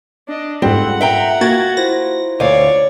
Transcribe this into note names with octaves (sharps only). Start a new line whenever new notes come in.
D4 D#5
G#2 G3 C4 F4 A4 F#5
E5 G5 A#5
A#3 F#4 G#6 A6
E4 F4 C5 A#6
D2 C#5 D5 F5